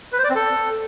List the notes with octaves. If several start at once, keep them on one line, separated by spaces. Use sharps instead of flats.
B4
C5
D5
C4
A4